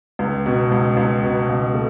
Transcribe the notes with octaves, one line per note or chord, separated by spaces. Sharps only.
C#2
B2
C#2
C#2
B2
C#2
A3